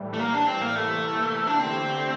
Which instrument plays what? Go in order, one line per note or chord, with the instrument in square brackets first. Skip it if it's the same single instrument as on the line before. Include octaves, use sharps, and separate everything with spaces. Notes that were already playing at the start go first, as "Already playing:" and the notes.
Already playing: [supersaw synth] A2 E3 G3
[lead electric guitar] A3
A#3
D4
C4
A#3
[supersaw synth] C3 E3 A#3 E4 [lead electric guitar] A3
[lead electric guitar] D4
[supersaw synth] D3 A3 E4 G4 [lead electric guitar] C4